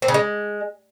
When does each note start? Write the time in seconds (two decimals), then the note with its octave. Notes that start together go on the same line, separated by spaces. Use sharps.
0.02 C4
0.08 C#3
0.14 G#3